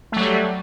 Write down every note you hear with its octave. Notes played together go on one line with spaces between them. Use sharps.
F#3 G3 A3